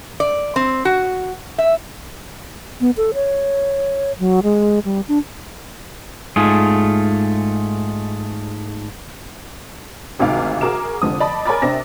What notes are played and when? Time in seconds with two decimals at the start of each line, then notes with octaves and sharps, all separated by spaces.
0.20 D5
0.56 C4
0.85 F#4
1.58 E5
2.81 B3
2.97 A4
3.14 C#5
4.19 F#3
4.43 G#3
4.85 G3
5.08 D4
6.36 G#2 A3 F4 G#4
10.19 G#1 D2 C3 D#3 F5 D6
10.61 F#4 G#4 A#4 D6 E7
11.02 F1 D3 F3 D#6
11.20 D5 D#5 A5 B5
11.46 A#4 C#5 G#5 B5 D6 A6
11.62 C3 C4 D4 A#6